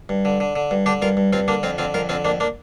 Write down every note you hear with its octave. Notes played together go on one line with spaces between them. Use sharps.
G2
D3
D3
D3
G2
D3 D4 G4
G2 F4 A#4
G2
G2 C4 F4
D3 A#3 D4
F2 C4 F4
D3 C4 F4
F2 F4 A#4
D3 C4 F4
F2 A#3 D4
A#3 D4